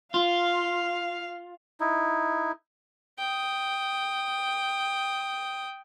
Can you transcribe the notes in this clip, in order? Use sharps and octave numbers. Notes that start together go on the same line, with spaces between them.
F4 F5
D#4 E4
G5 D#6